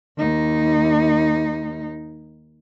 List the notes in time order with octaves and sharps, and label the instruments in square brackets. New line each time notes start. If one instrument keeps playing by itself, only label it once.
[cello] D#2 D#4